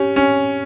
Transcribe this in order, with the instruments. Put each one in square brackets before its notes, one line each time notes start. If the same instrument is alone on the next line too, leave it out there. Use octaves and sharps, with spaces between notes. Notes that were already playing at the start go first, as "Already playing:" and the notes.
Already playing: [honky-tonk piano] C#4 [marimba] G4
[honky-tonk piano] C#4